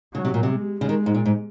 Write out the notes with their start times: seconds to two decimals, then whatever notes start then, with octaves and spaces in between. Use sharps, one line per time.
0.14 C#3 F#3
0.25 C3
0.34 A#2
0.43 C3 G#3
0.80 C#3 G#3
0.89 D#3
1.06 G#2
1.15 A#2
1.26 G#2